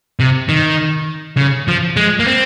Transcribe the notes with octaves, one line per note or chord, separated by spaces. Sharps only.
C3
D#3
C#3
F3
G#3
A#3
C4